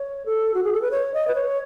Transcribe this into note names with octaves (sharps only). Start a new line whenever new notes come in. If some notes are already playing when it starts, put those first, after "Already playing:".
Already playing: C#5
A4
F#4
G#4
A4
B4
C#5
D#5
B4
C#5